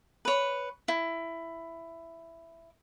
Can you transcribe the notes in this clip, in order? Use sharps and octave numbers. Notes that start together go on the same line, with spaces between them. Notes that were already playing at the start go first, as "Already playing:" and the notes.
B4 C#5
E4